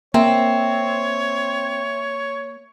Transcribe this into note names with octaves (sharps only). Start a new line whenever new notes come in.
A#3 C4 C#5 E5